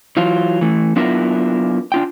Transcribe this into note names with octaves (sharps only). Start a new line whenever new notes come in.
E3 F#3 F4
E3 A3
F#3 B3 D4 E4 F4 A#4
D4 F4 G5